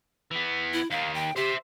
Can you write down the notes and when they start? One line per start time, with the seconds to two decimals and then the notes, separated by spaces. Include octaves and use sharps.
0.31 E3 B3
0.73 E4
0.91 D#2 D#3 F5
1.14 G5
1.36 G4 C5 E5